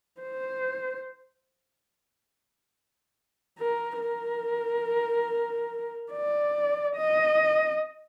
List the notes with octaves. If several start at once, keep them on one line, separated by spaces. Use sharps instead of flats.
C5
A#4
A#4
D5
D#5